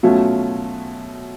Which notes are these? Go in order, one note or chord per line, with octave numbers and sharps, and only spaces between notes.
B2 F#3 A3 C#4 F4